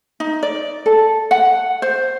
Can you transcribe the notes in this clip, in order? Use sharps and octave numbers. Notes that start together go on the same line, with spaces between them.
D#4
D5
A4
F#5
C5